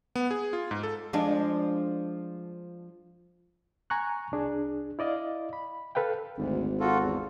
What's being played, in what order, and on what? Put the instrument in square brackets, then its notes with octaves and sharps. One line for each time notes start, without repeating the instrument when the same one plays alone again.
[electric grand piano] B3
G#4
F4
G#2
A4
[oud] F3 G#3 D4
[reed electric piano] G#5 A#5 C#6 F#6
C2 D4 G#4
E4 D5 D#5 F5
B5
A4 B4 F5 G5
[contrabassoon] G#1 [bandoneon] D2
[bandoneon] F4 F#4 A4
E2